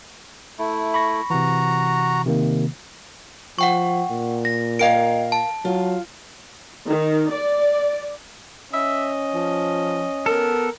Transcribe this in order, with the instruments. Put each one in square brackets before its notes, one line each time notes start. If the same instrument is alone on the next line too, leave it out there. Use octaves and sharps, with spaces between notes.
[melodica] A3 E4
[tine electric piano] B5 C#6 A#6
[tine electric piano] C3 E3 [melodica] F#4 A#5
[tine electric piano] C3 D#3 A#3
[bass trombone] F3 [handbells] F#5 G5 C#6
[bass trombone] A#2
[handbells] A#6
[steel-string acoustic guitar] A#4 F5 [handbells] D#5 G5 D7
[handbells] A5
[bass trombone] F#3 [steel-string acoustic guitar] F4
[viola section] D#3
D5
[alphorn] C#4 [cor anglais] D#5 [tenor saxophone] E5
[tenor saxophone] F3
[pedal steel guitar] B3 A4 [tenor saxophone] A#4